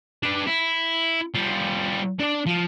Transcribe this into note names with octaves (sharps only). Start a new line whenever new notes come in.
D4 B4
E4
G3 F4
D4 D5
F3